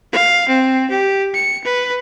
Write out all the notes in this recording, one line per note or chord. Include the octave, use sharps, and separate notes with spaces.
F5
C4
G4
C#7
B4